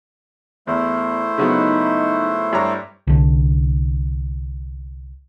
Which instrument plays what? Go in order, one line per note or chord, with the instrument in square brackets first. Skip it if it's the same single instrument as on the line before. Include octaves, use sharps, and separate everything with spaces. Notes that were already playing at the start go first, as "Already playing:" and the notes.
[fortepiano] E2 [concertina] A3 E4 C5
[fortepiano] C#3 F#3 B3 [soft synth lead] D#4
[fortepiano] G2 C#5 A#5 [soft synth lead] D6
[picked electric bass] C2 D3